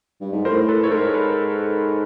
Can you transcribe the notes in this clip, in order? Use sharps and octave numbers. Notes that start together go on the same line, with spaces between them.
G2
G#2
A2 A#4 C5
A4 B4
A2 C#5
G#2 A#4 C5
A4 B4